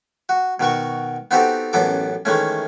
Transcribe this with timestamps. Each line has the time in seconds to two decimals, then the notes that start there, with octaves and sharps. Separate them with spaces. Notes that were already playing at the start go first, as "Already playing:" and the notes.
0.29 F#4
0.60 B2 D#3 F#4 C#6
1.31 B3 C4 D#4 F#4 G4 A4
1.73 A1 F#2 B3 A4 D6
2.25 D#3 E3 G#3 A3 C#4